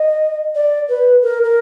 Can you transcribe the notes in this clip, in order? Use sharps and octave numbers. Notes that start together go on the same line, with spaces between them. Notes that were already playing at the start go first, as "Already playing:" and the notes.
Already playing: D#5
D5
B4
A#4
A#4